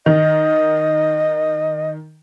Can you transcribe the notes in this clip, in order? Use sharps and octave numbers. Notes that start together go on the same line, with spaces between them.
D#3 D#5